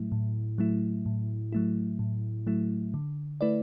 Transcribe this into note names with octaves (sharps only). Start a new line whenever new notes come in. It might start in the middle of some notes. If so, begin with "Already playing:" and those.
Already playing: A2 F#3 A3 E4
A2
F#3 A3 E4
A2
F#3 A3 E4
A2
F#3 A3 E4
D3
A3 E4 B4 D5